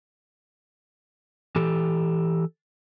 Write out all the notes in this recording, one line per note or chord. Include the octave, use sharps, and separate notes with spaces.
E3 G4 A4